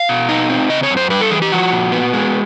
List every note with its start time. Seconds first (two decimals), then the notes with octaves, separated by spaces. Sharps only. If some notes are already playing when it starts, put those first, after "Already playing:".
Already playing: F5
0.09 B2
0.29 D#4
0.50 C4
0.69 C#3 D#5
0.83 C#5
0.90 F#2
0.97 C5
1.10 G3 B4
1.21 A4
1.31 E3 G#4
1.42 G4
1.52 F3 F#4
1.72 A#2
1.92 B3
2.13 G#3